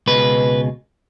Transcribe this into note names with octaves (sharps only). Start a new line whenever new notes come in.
C#2 B2 G#3 B4